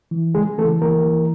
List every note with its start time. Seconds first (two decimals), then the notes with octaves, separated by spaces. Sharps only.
0.11 E3
0.35 C#3 G#3 G#4
0.58 E3 A3 A4
0.82 E3 A#3 A#4
1.06 E3